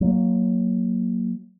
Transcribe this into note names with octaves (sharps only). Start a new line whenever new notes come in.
F#3 A#3